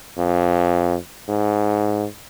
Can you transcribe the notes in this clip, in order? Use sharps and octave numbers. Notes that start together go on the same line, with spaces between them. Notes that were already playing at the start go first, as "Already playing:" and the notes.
F2
G#2